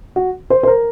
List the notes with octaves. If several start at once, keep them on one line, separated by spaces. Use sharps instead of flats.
F#4
C5
C5
A#4